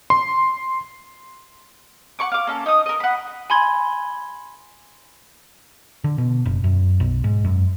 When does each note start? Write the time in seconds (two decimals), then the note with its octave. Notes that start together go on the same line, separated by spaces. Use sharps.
0.10 C6
2.19 F#5 B5 C#6 D6
2.32 F5 D6
2.47 A#3 C#4 A4
2.66 D#4 D#6
2.86 A#4 D#5
3.00 F#5 B5
3.50 G#5 B5 C6 G#6
6.04 D3
6.18 B2
6.46 F#1
6.64 F#2
7.00 B1
7.24 G#2
7.44 F#2